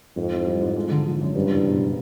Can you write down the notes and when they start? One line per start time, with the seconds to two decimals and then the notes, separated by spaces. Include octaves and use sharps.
0.16 F2 G#2
0.32 E3
0.47 G3
0.62 G#2
0.76 G#3
0.91 D3
1.06 F3
1.20 F#2
1.35 F#1 G2
1.51 E2
1.66 B2